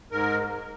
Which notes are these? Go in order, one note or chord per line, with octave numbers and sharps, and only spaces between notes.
G#2 A#4